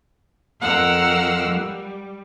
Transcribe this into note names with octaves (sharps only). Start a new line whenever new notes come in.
F2 A#4 F5 F#5 E6 F6
G3